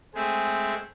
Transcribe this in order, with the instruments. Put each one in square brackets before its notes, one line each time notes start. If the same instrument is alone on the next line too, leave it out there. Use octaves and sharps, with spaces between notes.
[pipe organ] G#3 A3 C4 G#4